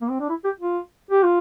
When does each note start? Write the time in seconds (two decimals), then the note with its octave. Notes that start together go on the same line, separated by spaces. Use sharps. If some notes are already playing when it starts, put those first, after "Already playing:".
0.01 A#3
0.10 C4
0.20 D4
0.29 E4
0.44 G4
0.60 F4
1.11 G4
1.23 F4